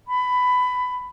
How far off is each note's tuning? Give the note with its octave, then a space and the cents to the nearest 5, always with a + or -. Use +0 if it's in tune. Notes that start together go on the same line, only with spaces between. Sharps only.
B5 +15